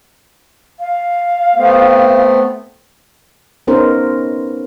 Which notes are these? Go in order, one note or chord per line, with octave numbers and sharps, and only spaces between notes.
F5
A3 B3 C4
B3 C#4 D#4 A#4 C5